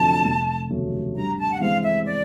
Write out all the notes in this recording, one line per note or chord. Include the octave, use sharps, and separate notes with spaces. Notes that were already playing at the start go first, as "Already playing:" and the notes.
Already playing: F1 F2 D3 F#3 A3 A5
F1
D#2 C#3 F#3 A3
G2 A#5
A5
F#5
E3 G#3 C4 F5
E5
D5